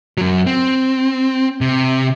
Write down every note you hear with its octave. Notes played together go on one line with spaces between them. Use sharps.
F#2 F#3
C4
C3